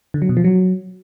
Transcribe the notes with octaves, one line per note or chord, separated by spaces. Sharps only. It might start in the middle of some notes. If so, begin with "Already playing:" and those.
D3
F#3
B2
F3
F#3